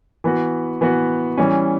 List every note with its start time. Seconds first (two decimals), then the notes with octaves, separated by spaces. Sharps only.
0.24 E3 B3 F#4
0.81 E3 B3 F#4
1.38 E3 G3 C#4